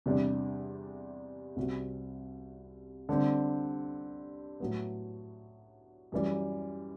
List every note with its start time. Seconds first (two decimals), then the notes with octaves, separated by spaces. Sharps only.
0.06 E2 C3 G3 D4
1.56 C2 C3 G3 C4 F#4
3.09 D3 G3 C4
4.60 A2 F#3 B3
6.12 F#2 E3 G3